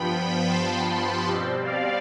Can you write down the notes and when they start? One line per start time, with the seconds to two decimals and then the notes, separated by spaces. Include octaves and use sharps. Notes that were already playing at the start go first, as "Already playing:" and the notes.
Already playing: G2 F3 B3 G5 B5
0.48 A5 C6
0.87 G5 B5
1.26 B2 G3 C4
1.65 D5 F5